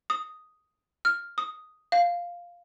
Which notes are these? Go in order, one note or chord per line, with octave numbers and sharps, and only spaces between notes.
D#6
F6
D#6
F5